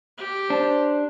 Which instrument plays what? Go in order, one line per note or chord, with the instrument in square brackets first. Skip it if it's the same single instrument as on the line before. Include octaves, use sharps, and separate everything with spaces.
[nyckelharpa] G4
[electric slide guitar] D4 [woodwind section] C5